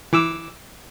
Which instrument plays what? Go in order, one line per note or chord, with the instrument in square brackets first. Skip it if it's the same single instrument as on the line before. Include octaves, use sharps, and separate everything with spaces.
[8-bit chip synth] E3 D6 E6